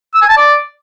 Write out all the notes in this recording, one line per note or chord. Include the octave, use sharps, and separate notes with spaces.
E6
G#5
A5
D5